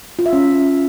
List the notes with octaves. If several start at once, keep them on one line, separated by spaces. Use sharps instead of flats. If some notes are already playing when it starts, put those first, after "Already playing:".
F4
E5
C#4